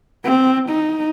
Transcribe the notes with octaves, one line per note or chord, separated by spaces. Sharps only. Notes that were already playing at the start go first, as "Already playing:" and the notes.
C4
D#4